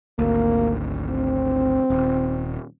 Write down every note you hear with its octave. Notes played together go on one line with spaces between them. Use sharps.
G#1 D2 A#3
C4
D#1